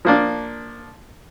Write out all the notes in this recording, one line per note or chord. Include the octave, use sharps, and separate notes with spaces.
F3 A#3 D4